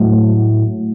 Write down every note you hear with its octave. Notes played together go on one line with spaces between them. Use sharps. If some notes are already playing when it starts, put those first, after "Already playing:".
Already playing: A2 F#3 A3 F#4